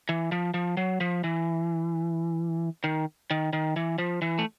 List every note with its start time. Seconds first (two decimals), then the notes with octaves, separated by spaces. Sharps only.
0.09 E3
0.32 F3
0.54 F3
0.77 F#3
1.00 F3
1.24 E3
2.84 D#3
3.31 D#3
3.53 D#3
3.76 E3
3.98 F3
4.22 E3
4.39 A3